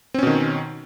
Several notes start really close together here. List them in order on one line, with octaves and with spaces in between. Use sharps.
C4 C#4 B2 D#3